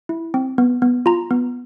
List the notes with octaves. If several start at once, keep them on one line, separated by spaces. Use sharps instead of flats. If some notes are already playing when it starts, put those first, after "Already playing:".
E4
C4
B3
B3
F4 A#5
B3